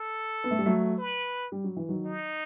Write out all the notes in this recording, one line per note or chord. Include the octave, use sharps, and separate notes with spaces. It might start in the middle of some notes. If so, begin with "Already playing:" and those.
Already playing: A4
B3
A3
G3
F#3 A3
B4
G3
F#3
E3
D#3 F#3
D#4